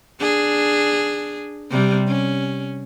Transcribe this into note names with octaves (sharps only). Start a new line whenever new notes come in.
D4 G#4
C3 G3
C#4